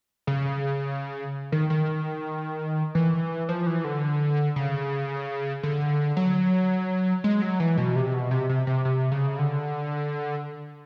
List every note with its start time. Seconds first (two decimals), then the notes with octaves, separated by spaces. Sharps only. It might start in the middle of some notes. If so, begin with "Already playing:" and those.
0.27 C#3
1.52 D#3
1.70 D#3
2.95 E3
3.49 F3
3.67 E3
3.84 D3
4.56 C#3
5.63 D3
6.17 F#3
7.24 G#3
7.42 F#3
7.60 E3
7.77 B2
7.96 C3
8.14 B2
8.31 C3
8.49 C3
8.67 C3
8.85 C3
9.12 C#3
9.39 D3